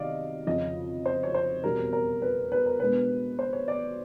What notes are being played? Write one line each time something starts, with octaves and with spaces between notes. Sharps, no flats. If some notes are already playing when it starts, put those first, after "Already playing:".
Already playing: C3 D#3 F#3 D5 D#5 F5
F2 C#3 F3 D#5
C5
C#5
C5
E2 B2 G3 C4 A#4
A#4
B4
B4
A#4
B2 G#3 B3 D4 B4
C5
C#5
D5